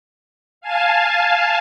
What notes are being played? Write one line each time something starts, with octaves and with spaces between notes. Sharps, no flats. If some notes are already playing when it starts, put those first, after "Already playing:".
F5 G#5 A5